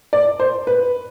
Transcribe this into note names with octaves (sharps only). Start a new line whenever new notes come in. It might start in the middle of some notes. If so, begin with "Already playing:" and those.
D5
C5
B4